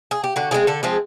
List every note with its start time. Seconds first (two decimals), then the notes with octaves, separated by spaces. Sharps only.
0.11 G#4
0.24 G4
0.36 D3 F#4
0.51 F3 G#3 C4 G#4
0.67 D3 A4
0.83 F3 G#3 C4 G#4